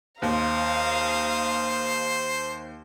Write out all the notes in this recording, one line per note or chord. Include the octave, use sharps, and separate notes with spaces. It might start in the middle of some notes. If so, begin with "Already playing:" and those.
D#2 C5 F5 A#5 D#6